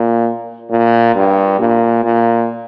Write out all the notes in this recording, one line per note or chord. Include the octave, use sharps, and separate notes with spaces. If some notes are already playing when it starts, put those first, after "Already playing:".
Already playing: A#2
A#2
G2
A#2
A#2